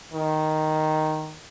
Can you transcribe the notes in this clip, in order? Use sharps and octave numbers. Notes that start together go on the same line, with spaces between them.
D#3